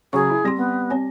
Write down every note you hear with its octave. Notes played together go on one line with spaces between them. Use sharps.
C#3 F#3 G#4 C#6
E4
G3 C4 G4 C6 A#6
B3
C4 C#5 G#5